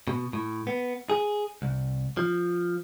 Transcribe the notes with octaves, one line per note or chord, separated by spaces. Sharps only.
B2
A2
B3
G#4
C2
F3